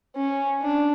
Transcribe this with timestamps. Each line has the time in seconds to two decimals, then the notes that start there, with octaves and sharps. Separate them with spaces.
0.16 C#4
0.61 D4